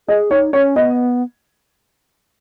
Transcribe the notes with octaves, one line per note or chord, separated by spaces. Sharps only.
G#4 D#5
D#4 C#5
C#4 C#5
B3 D#5